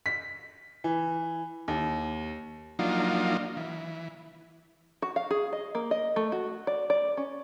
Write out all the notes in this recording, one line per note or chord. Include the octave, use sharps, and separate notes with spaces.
B6
E3
D#2
F3 F#3 A#3 D4 D#4 F4
E3
F#4
F5
G#4
D#5
A#3
D#5
A3
F#4
D5
D5
C#4